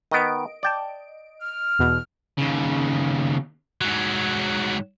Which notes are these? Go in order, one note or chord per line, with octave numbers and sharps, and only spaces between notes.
D#3 B3 D#5 D7
D5 G5 A5
F6
E2 B2
D#2 C#3
G#2 F#3